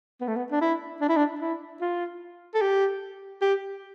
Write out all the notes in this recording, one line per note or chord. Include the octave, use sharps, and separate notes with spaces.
B3
A3
B3
D4
E4
D4
E4
D4
E4
F4
A4
G4
G4